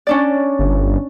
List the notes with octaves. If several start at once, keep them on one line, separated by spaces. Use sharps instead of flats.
C#4 D4 D5
G1